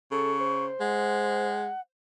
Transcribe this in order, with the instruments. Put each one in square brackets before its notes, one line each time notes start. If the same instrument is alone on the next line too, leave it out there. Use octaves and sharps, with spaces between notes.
[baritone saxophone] C#3 [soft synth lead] A4 [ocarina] C#6
[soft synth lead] C5
[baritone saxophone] G#3 [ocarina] F#5